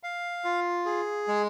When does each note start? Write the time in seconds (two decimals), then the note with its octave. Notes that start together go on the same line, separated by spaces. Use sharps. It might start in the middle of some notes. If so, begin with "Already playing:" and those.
0.03 F5
0.44 F4
0.86 G#4
1.28 G#3